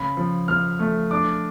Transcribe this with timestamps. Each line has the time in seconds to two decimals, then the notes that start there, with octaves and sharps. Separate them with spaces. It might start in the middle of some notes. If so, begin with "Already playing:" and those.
Already playing: C#3 B5
0.17 F3
0.48 F3 F6
0.79 A3
1.11 D4 D6